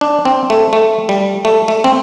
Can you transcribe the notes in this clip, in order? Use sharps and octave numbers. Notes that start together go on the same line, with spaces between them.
D4
C4
A3
A3
G3
A3
A3
C4